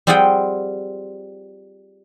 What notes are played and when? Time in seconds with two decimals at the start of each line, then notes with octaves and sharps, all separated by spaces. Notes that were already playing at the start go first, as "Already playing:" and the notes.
0.07 G3 C4 F4 G#4 F#5 G5